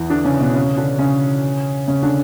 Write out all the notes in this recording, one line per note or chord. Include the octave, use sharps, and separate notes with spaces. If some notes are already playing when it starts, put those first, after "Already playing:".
Already playing: E2 E3
D3 D4
C#3 C#4
B2 B3
C#3 C#4
D3 D4
C#3 C#4
C#3 C#4
D3 D4